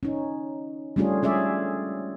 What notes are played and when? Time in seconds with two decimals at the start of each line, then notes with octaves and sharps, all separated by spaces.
0.03 C#4 D#4
0.96 G3 A3 C#4 D4 F4 G#4
1.22 G#3 C#4 G#4 D5 E5